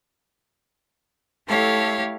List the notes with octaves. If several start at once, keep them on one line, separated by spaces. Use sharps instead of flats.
A3 E4 G4 A4 C#5 F5